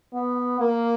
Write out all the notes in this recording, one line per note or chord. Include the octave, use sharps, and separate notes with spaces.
B3
A#3